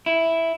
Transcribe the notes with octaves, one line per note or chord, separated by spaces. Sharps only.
E4